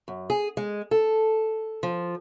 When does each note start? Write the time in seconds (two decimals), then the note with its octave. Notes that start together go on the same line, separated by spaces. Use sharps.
0.08 F#2
0.30 G#4
0.57 G#3
0.91 A4
1.83 F3